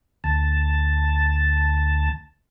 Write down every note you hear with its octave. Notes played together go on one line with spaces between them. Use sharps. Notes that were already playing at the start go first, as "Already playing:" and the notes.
D2 A5